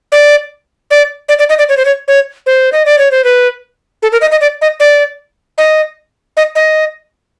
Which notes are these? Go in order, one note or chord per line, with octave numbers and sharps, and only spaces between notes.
D5
D5
D5
D5
D#5
D5
C#5
C5
C#5
C#5
C5
D#5
D5
C#5
C5
B4
A4
A#4
D#5
D#5
D5
D#5
D5
D#5
D#5
D#5